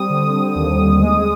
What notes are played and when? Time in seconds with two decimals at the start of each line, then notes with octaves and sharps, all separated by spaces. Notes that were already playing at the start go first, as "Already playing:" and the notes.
Already playing: G3 C4 D#6
0.10 D3
0.55 D#2
0.99 G#3